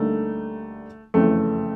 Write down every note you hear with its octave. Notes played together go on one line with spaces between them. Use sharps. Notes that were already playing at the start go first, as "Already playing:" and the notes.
Already playing: D2 D3 G3 A3 A#3 D#4
F#1 F2 C#3 E3 A3